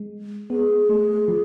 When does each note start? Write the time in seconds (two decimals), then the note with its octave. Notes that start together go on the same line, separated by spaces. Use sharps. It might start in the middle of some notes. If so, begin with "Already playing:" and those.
Already playing: G#3
0.50 B3 G#4
0.89 A3
1.28 F3